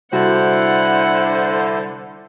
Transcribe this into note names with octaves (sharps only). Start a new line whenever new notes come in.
C2 D3 E4 F#4 C5 F#5